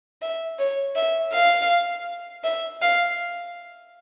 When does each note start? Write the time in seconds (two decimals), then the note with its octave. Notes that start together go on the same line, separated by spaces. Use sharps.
0.22 E5
0.58 C#5
0.96 E5
1.33 F5
2.44 E5
2.81 F5